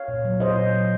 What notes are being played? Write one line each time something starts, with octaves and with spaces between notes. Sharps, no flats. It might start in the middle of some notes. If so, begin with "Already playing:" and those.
Already playing: C#5 F5
A#2
F#3
A#2 C5 D#5
A#2
F#3